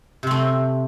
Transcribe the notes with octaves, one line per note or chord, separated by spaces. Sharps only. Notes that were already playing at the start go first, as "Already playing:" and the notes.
C3 A3 C4